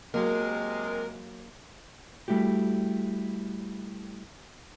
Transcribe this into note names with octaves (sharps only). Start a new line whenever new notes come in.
C3 F#3 G#3 A#3 A#4
G3 A3 E4 F#4 G4